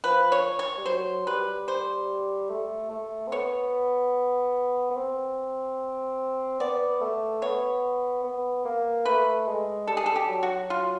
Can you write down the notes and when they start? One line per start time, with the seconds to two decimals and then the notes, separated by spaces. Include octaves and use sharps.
0.04 F3 B4
0.32 C#5
0.59 C#5
0.78 G3
0.85 F#3 C5
1.27 G3 B4
1.68 C5
2.50 A3
2.90 A3
3.27 C4
3.32 B3 C#5
4.91 B3
4.96 C4
6.60 B3 D5
7.01 A3
7.42 B3 C#5
8.24 B3
8.65 A#3
9.05 A3 B4
9.48 G#3
9.87 G3 A4
9.97 G#4
10.06 A4
10.16 G4
10.29 F#3
10.43 F#4
10.70 F4